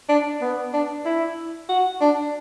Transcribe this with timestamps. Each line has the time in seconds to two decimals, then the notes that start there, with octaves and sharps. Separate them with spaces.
0.09 D4
0.41 B3
0.73 D4
1.06 E4
1.69 F#4
2.01 D4